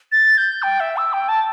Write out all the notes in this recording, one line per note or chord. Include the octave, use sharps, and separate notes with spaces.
A6
G6
G5
E5
E6
G5
A5